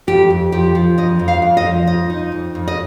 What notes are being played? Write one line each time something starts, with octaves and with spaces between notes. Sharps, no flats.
F2 G4
F2
F3 G4
F3
F2 D#5
F2
F5
F2
D#5
F3
F2 D#5
D#4
F2
F2
D#5